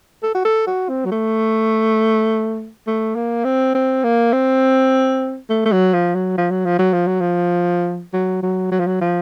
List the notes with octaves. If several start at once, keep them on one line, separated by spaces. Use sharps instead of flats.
A4
F#4
A4
F#4
C4
F#3
A3
A3
A#3
C4
C4
A#3
C4
A3
A3
F#3
F3
F#3
F3
F#3
F3
F#3
F3
F#3
F3
F#3
F#3
F#3
F3
F#3
F3